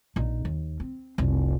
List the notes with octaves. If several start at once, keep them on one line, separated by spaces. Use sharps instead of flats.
A#1 D#4
D#2
C4
F1 C2